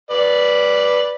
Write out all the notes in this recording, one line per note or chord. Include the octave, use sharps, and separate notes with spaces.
B4 D5